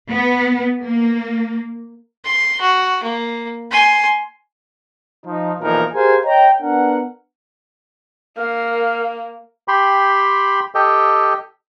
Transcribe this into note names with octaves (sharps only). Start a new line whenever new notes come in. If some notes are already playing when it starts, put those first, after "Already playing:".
B3
A#3
C6
F#4
A#3
G#5 C6
F3 D#4
B1 A#2 E3 F3 D#4 A#4
G4 G#4 A#4 C5 F5 G#5
C#5 D#5 G5 A#5
B3 D4 A#4 F#5
A#3 A#4 F5 F6
G4 G5 B5 C6
G4 A4 D#5 G5